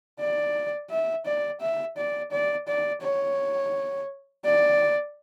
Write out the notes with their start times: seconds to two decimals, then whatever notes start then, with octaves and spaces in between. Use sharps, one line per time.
0.20 D5
0.90 E5
1.26 D5
1.61 E5
1.97 D5
2.32 D5
2.68 D5
3.02 C#5
4.45 D5